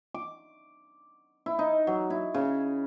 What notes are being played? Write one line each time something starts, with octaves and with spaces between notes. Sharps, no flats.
D6
E4
D#4
F#3
E4
C#3